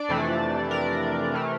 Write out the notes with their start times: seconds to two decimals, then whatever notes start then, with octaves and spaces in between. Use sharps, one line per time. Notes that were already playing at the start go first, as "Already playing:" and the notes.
Already playing: D4 D5
0.09 F2 C3 E3 A3
0.71 A#4
1.34 C3 E3 A3